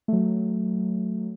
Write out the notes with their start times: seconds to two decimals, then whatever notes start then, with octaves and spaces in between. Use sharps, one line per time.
0.08 F#3 A3